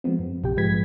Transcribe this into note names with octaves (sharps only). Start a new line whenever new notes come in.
F3 G#3 B3 C4
F#2
A#1 C3 G4 G5
G#2 F3 G#3 B4 G#6 B6